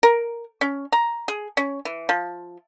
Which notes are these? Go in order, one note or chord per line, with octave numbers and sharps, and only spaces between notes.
A#4
C#4
A#5
G#4
C#4
E3
F3